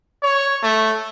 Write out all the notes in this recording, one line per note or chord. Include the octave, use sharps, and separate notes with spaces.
C#5
A3